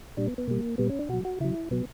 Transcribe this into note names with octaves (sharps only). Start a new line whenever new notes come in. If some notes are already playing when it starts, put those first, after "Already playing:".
A#2 G3 D4
B3
B3
B2 G3 A#3
A#2 G3 B3
C#4
D4
B2 F#3 F#4
F#4
C#3 F#3 E4
B2 F#3 B3